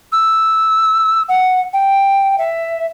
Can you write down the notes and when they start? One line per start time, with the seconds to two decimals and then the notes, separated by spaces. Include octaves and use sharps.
0.12 E6
1.29 F#5
1.73 G5
2.38 E5